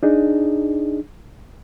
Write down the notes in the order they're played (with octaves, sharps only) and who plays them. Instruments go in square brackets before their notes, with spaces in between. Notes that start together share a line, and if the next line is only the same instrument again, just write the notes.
[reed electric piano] D4 D#4 G#4